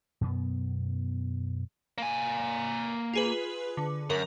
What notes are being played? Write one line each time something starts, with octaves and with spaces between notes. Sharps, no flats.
F#2 B2 B3
A#3 G#5
F4 G#4 B4
D3
F#2 A#4